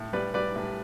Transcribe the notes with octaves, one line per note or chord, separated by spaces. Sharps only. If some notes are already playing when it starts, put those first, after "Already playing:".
Already playing: A2
G3 B4 D5
G3 B4 D5
A2